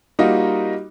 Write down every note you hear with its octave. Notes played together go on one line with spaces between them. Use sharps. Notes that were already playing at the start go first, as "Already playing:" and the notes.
G3 A#3 D#4 F4 F#4 D#5